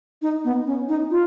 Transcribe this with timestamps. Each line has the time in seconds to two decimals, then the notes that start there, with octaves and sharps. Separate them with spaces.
0.22 D#4
0.45 B3
0.66 C#4
0.89 D#4
1.11 F4